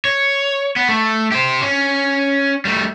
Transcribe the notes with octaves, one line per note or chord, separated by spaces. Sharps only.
C#5
B3
A3
G4 C5
C#4
G3 A3